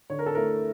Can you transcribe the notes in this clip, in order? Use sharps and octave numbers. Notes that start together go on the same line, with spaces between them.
D3 C#5
A#4
A4
A3 E4 A#4